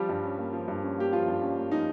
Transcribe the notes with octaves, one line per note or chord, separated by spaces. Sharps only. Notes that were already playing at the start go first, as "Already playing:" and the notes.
Already playing: F3 G3 G4
G2
C#4
A#3
F3
G2
C#4
A#3 G4
F3 F4
G2
C#4
A#3
F3 D#4